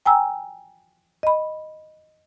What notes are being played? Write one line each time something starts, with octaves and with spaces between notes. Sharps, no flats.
G5 G#5 A#5 E6
D#5 B5